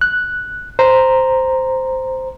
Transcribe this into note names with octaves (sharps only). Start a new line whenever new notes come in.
F#6
C5 A#5